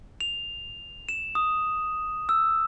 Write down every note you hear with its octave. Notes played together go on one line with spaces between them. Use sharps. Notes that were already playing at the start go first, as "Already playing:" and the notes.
F7
E7
D#6
E6